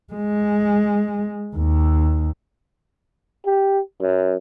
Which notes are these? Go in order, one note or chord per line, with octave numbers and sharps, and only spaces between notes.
G#3
D#2
G4
F#2